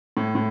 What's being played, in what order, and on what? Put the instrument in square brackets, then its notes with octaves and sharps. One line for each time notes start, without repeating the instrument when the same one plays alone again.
[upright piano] A2
A2